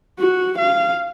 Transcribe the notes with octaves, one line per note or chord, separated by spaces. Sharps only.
F#4
F5